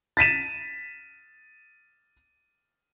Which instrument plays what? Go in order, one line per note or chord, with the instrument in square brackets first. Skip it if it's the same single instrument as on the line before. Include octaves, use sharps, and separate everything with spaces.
[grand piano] A6 B6 D#7 E7